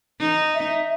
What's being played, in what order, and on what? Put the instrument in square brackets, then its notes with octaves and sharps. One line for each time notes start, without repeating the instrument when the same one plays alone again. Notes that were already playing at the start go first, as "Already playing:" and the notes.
[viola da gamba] D#4
[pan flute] E5